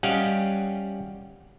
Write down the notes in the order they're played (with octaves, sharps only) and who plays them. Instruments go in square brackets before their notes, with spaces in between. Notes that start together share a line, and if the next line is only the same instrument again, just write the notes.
[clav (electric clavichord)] G3 C#4 G4 D#5 F5 F#5